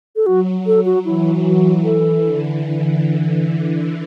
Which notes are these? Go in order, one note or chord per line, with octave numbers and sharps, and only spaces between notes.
A4
F#3 F#4
A4
F#4
E3 E4
E3 F#4
E3 A4
D3